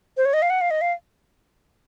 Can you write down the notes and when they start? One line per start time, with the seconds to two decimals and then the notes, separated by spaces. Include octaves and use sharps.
0.17 C5
0.25 C#5
0.33 D#5
0.42 F5
0.50 F#5
0.61 F5
0.70 D#5
0.81 F5